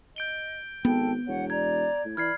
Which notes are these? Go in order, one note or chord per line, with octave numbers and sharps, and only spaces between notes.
D#5 G6 D7 G7
G#1 B3 A4 G5
E1 C#5 F#5
D5 A#5 G#6
A2
E3 D5 B5 F6 G#6 C7